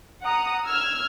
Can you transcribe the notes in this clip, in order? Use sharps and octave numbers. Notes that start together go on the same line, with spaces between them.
F#5 A#5 D#6
E6 F6 G#6